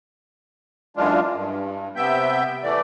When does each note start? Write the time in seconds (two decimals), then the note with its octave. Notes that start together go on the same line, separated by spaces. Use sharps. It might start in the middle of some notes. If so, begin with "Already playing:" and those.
0.97 F#2 E3 G#3 D4 F4
1.33 G2
1.96 C3 B3 E5 G5 G6
2.63 E2 E3 A3 D5